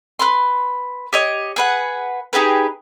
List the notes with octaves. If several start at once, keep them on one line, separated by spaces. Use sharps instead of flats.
B4 B5 C6
G4 C#5 D#5
G#4 B4 F#5
D#4 G4 G#4 B4